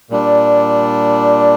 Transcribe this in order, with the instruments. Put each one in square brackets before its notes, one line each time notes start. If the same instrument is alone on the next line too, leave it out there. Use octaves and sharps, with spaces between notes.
[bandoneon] A#2 G3 D4